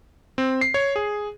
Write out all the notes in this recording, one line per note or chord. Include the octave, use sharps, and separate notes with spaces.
C4
C7
C#5
G#4